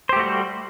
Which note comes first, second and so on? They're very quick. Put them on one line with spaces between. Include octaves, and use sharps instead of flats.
C5 G4 A3 F#4 G3